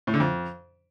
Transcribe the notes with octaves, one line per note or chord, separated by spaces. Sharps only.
A2
D3
F2